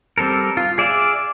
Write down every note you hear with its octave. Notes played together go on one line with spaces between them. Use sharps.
G3 C4 A4 A#4
F4
G#4 D5 E5 F5